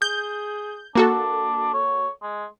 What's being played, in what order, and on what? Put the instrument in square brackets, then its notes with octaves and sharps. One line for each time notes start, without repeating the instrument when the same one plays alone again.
[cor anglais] G#4 [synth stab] G6
[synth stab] A#3 F#4 A4 [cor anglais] D4
[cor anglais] C#5
G#3